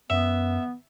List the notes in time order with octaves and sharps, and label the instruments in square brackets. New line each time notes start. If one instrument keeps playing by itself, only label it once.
[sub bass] F#2 [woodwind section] B3 [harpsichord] E5